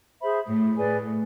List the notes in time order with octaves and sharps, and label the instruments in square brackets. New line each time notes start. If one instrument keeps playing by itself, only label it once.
[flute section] G#4 C5 E5 B5
[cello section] A2
[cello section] A2 [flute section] G#4 B4 D5 G#5